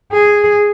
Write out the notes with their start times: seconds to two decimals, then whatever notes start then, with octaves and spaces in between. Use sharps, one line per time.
0.12 G#4